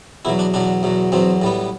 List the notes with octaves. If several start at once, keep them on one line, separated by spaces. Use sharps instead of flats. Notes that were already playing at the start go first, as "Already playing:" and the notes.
E2 B2 F#3 E4
D4
E2 B2 F#3 D4
E2 B2 F#3
E2 B2 F#3 C4
A2 G3 B3